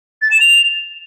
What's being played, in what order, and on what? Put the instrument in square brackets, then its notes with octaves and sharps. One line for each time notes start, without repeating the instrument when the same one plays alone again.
[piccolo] A6
E7
F7